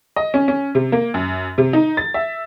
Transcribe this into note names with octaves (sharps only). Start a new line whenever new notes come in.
D#5
C#4
C#4
C3
A#3
F#2
C3
D#4
A6
E5